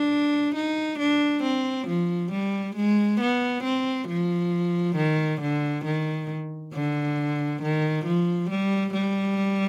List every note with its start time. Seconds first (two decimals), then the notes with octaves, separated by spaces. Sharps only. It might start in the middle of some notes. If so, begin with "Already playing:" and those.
Already playing: D4
0.55 D#4
0.99 D4
1.43 C4
1.87 F3
2.32 G3
2.75 G#3
3.20 B3
3.64 C4
4.08 F3
4.96 D#3
5.41 D3
5.85 D#3
6.73 D3
7.62 D#3
8.05 F3
8.50 G3
8.94 G3